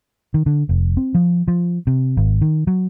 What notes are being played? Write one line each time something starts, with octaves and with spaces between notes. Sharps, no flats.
D#3
D3
F1
C4
F3
F3
C3
G#1
D#3
F#3